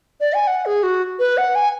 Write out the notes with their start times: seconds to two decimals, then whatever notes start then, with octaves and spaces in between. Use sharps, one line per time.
0.20 D5
0.34 G#5
0.47 F#5
0.66 G#4
0.83 F#4
1.19 B4
1.37 F#5
1.55 G#5